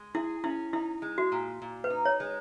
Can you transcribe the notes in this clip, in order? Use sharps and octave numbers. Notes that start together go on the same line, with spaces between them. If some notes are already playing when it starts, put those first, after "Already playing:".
Already playing: G#3
E4 G#4
C#4 E4
D#4 E4
G#3
F#4
A#2
A#2
B4
D#4
C#5
G#3